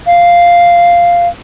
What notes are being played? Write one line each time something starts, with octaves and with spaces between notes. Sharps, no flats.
F5